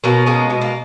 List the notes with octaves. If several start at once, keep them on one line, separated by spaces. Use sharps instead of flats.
B2 A#3 C#4
G#3 A#3 C#4
B2 B3
A#3